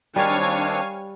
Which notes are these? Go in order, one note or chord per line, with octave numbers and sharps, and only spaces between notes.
D#3 G3 C4 D4 C#5 F5 G#5